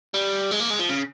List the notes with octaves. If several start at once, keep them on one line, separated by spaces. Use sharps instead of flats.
G3
G#3
A#3
G#3
F3
C#3